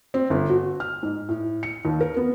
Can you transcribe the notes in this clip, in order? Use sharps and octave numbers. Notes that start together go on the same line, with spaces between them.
C4
G1
F#4
F6
G#2
A2
C#7
D#2
A#4
B3